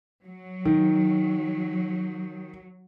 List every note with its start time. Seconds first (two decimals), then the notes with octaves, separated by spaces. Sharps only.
0.24 F#3
0.65 D#3